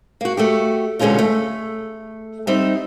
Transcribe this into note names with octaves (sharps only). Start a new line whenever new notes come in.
A#3 F#4
A3 F#4 G4
B2 D3 G#3 C#4 D#4 F4
A3
G3 C4 D#4 E5